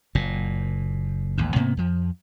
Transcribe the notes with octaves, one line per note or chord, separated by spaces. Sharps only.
F#1 A#2
A1 D#2 G#2
G#2 C3 A#3 B3
F2 F3